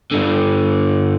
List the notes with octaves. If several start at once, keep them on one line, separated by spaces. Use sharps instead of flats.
G2 D3